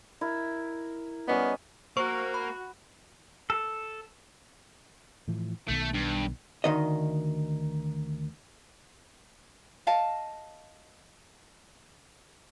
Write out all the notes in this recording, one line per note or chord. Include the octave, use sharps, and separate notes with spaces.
E4 A#4
G3 B3 C#4 D#5
A#3 F#4 A#4 C5 C#6
B5
A4
A2 E3 F3
B1 D#3 A3 B3
G2
D2 D#3 D#5
D#5 F5 A5